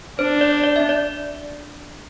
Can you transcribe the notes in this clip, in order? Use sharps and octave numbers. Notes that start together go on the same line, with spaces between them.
D4 C5
D5
D5
E5
D5